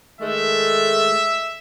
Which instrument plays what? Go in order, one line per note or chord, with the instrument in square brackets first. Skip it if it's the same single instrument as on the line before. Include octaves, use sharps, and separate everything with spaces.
[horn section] D#3 G#3 A3 [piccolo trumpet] E5